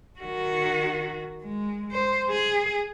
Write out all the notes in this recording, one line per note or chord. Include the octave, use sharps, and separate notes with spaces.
D#3 F#4
G#3
C5
G#4